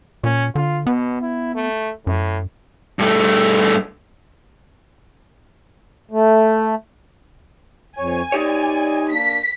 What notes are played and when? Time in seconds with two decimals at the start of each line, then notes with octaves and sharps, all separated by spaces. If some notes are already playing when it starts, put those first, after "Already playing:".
0.24 A#2 C#4
0.55 D3 F4
0.87 B2 B3
1.22 E4
1.55 A3
2.07 F#2 A2
2.99 G2 A3
6.11 A3
7.98 F2 C#5 G#5
8.32 D#4 G4 C#5 D5
9.11 A#3 D4 B6